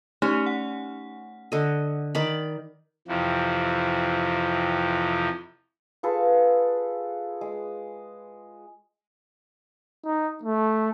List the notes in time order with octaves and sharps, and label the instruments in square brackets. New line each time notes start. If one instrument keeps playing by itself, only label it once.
[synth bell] A3 D#4 G4 [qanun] C#4
[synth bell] F#5
[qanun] D3 D#5
D#3 D5 B5
[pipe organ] F2 C3 E3 F3
[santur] F4 G#4 A4 B4
G#3
[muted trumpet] D#4
A3